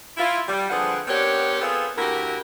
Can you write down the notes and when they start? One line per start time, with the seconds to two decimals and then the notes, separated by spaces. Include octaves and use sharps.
0.17 E4 F4
0.48 G3
0.70 D3 F3 C4 G#4 B4 F#5
1.08 B3 C4 D4 G4 A#4 C#5
1.61 B3 C4 F4 G#4 A4 B4
1.97 D2 E4 F#4 G4 A#4